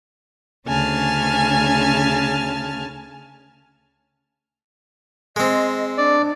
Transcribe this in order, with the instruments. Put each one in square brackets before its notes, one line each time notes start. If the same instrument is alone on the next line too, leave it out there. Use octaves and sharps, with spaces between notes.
[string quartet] D2 C#3 C#4 G#5 A5 F6
[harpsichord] G#3 C4 [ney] D#5
[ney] D4 [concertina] D5